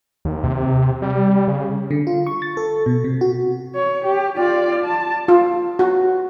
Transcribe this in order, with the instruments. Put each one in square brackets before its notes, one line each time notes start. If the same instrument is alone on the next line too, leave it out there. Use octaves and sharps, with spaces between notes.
[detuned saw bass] D#2
C3
G3
C#3
[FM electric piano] D3
F4
C#6
A6
A4
B2
C3
F#4
[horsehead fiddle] C#5
G4
F4 D5
A5
[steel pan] F4
F#4